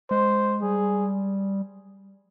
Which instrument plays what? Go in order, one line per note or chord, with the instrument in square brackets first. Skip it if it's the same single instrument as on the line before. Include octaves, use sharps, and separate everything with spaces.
[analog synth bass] G#3 [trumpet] C5
[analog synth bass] G3 [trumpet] G#4